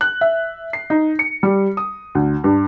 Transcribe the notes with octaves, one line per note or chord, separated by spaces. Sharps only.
F#6
E5
C7
D#4
C#7
G3
D#6
D2
G2